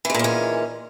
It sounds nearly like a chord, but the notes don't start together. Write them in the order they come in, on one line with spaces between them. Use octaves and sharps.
E3 G#3 A#2 D#3 C#4